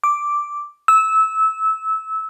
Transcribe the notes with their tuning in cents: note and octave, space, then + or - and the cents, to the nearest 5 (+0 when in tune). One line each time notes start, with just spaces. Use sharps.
D6 +0
E6 -20